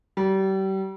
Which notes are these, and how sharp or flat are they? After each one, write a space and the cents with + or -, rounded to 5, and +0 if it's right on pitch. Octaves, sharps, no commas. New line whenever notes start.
G3 -35